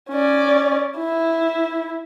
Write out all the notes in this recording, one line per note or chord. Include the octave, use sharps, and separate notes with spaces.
C#4 D5
E4